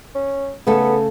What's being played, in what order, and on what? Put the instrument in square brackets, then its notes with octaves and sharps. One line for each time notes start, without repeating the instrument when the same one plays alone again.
[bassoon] C#4
[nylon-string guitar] C#3 A3 A4 [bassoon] B3